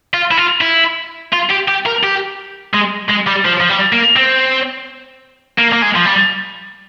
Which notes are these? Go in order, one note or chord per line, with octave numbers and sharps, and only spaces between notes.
F4
E4
F4
E4
F4
G4
G4
A#4
G4
G#3
G#3
G3
F3
F3
G3
A#3
C4
A#3
A#3
G#3
F3
G3